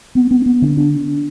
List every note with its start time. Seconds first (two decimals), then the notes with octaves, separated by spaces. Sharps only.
0.15 B3
0.31 B3
0.46 B3
0.62 D3
0.77 D4